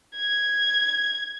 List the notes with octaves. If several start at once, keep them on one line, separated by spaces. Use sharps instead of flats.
G#6